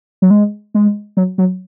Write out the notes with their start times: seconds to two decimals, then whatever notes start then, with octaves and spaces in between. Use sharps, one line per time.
0.22 F#3
0.31 G#3
0.75 G#3
1.17 F#3
1.38 F#3